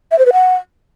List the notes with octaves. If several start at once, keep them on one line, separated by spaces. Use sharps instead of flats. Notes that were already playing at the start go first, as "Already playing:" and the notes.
E5
C5
B4
F#5